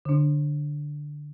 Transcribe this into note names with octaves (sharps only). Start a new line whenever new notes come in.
D3 D4